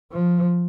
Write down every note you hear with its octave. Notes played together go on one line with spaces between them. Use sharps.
F3